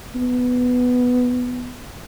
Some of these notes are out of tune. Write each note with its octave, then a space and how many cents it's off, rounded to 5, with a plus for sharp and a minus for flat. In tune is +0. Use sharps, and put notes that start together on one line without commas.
B3 +5